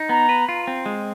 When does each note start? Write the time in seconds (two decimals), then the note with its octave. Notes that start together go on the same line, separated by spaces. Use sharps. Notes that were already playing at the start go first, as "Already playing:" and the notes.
Already playing: D#4
0.09 B3 A#5
0.29 B4
0.49 F4
0.67 C4
0.86 G#3